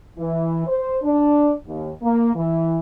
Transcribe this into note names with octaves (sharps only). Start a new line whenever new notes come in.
E3
C5
D4
D#2
A#3
E3